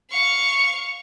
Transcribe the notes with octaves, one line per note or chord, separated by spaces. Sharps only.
F5 C#6